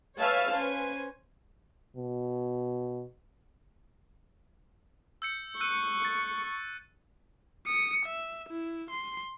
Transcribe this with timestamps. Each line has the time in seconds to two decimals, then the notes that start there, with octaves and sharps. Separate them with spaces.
0.20 B4 C#5 E5 F5 G#5 A5
0.52 C#4 B4 C5 G#5
1.96 B2
5.22 E6 G6 C#7
5.60 C#6 E6 F#6 D#7
6.05 A6
7.67 D#6 C#7
8.05 E5
8.49 E4
8.91 C6